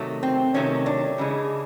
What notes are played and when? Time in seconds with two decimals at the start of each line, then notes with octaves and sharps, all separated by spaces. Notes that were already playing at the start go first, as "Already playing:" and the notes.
Already playing: C3 D#3 F#3 A3
0.23 C4
0.54 C3 D#3 F#3 A3 C#4
0.86 D4
1.18 C#3 E3 G#3